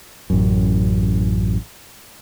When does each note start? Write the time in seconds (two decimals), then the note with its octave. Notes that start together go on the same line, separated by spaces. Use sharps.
0.30 A1 F#2